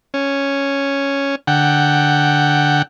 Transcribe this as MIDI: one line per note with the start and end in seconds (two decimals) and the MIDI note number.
0.14 1.35 61
1.47 2.82 50
1.47 2.82 78
1.47 2.82 79